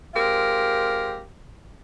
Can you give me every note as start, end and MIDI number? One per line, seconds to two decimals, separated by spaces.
0.14 1.22 56
0.14 1.22 60
0.14 1.22 65
0.14 1.22 67
0.14 1.22 70